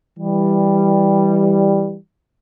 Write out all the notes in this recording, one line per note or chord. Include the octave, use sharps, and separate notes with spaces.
E3 G3